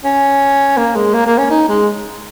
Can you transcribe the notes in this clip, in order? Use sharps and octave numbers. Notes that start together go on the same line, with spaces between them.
C#4
A#3
G#3
A#3
A#3
C#4
D#4
G#3